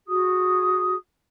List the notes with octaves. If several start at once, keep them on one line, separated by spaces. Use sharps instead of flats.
F#4 G#4 D#6